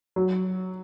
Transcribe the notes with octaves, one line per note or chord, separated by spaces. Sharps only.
F#3